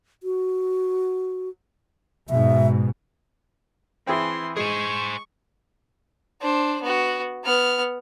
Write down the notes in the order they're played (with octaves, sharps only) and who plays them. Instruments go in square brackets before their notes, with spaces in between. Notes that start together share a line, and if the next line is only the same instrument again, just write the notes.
[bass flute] F#4
[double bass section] G#2 B2 [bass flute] E5
[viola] E3 C6 [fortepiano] C4 E4 G#4
[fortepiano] G#3 [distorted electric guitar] G#4 C5 [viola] C#6
[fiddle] D4 C5
B3 F#4
B3 F6